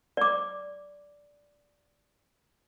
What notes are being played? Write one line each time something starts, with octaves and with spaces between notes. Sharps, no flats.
D5 D6